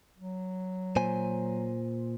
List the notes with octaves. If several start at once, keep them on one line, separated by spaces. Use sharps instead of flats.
F#3
A#2 C5 G#5